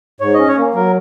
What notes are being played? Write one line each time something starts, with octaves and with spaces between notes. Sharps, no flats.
G#2 C#5
C#4 D#5
C#5
A#3
F#3 A#4